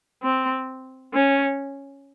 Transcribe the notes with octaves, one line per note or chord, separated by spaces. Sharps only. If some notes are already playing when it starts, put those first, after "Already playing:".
C4
C#4